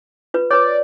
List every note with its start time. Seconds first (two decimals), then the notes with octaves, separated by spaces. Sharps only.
0.34 F4 B4
0.50 B4 C#5 D5